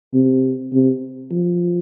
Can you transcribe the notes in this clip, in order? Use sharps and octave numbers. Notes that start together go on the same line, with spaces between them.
C3
C3
F3